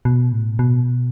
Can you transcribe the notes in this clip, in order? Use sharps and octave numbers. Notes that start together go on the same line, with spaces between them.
B2
A2
B2